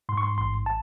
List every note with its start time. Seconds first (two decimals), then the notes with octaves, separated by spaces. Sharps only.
0.09 G#2 C6
0.17 C#6
0.23 C6
0.38 A1 C6
0.66 A5